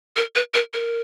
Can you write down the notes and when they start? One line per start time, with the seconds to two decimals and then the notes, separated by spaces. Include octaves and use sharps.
0.16 A#4
0.35 B4
0.54 A#4
0.73 A#4